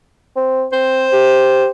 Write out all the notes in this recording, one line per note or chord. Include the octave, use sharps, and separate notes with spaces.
C4
C4 C5
G4